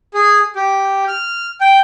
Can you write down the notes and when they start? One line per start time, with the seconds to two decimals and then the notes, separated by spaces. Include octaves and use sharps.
0.14 G#4
0.56 G4
1.08 F6
1.61 G5